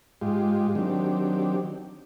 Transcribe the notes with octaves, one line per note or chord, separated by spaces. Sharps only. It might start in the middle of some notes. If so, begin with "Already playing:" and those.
G#2 G#3 F4 G4
D#3 F#3 C4 D4 G4